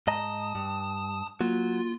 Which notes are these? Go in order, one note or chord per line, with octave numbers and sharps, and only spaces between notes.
G#2 D#5 A5 A#5 D#6
G2
F#3 A#3 F4